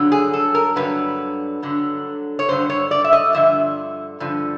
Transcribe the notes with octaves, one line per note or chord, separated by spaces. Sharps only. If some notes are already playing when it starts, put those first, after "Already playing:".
Already playing: G2 D3 F#3
G#4
A4
A#4
G2 D3 F#3 B4
G2 D3 F#3
C#5
G2 D3 F#3 C5
C#5
D5
E5
D#5
G2 D3 F3 E5
G2 D3 F3